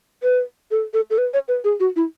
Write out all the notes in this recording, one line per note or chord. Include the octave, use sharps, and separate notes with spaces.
B4
A4
A4
A4
B4
C#5
B4
G#4
F#4
E4